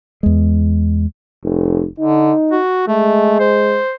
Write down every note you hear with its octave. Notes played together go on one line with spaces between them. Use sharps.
E2 G#3
F1
D3 D#4
F#4
G#3 A3
C5